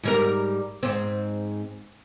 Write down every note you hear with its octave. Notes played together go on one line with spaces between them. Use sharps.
G#2 G3 A#4
G#2 C4